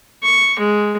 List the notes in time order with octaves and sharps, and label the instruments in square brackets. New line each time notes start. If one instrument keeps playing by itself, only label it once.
[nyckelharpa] C#6
G#3